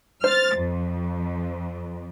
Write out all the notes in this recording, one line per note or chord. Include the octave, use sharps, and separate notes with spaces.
C5 F6 A6
F2